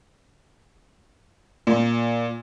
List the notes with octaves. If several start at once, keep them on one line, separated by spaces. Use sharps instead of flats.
A#2